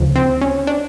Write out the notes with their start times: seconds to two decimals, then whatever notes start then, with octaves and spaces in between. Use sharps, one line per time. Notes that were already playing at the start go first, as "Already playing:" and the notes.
Already playing: D2 C#3 F3
0.16 C4
0.41 C#4
0.67 D4